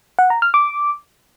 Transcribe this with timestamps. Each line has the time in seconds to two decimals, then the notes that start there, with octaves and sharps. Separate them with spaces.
0.19 F#5
0.30 A#5
0.42 F6
0.54 D6